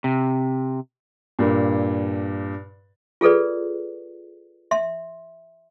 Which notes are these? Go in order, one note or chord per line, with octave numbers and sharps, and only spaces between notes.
C3
G2 A#2
F4 G#4 A4 B4 D5
E5 C6